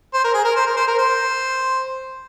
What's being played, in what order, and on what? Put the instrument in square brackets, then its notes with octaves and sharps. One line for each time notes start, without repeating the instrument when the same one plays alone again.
[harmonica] C5
A#4
G#4
A#4
C5
A#4
C5
A#4
C5